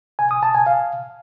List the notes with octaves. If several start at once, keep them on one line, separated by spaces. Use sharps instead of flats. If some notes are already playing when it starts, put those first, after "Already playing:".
G#5
D#6
A5
G#5
F5